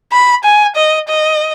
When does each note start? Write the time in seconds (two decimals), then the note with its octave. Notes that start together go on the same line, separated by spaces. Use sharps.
0.12 B5
0.44 G#5
0.76 D#5
1.08 D#5